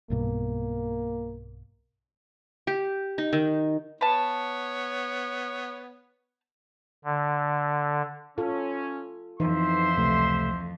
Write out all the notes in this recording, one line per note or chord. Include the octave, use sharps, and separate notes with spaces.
B1 G2 B2 A#3
G4
D#4
D#3
B3 B4 C#5 A5
D3
C#4 F4 A4
F2 E3 D#4 C5 E5 C6
C#2 C3 A3